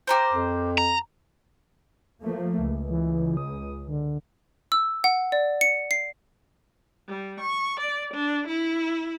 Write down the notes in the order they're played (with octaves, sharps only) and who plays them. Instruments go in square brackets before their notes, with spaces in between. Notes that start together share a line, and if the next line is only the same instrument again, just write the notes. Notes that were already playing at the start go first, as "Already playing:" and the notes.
[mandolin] G4 A#4 C5
[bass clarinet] F2
[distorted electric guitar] A#5
[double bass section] F3 A3 A#3
C#2
[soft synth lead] E3
D#6
D3
[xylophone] E6
F#5
D5
C#7
C7
[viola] G3
C#6
D5
D4
E4